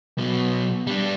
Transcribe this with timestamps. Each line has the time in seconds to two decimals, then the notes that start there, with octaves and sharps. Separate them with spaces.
0.18 B2 F#3
0.87 G3 D4